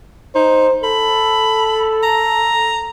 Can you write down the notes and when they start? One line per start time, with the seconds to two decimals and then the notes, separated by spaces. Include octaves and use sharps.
0.35 D#4 C5
0.84 A4 B5
2.03 A#5